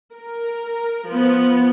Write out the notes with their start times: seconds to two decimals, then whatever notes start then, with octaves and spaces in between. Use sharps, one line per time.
0.12 A#4
1.07 F3 B3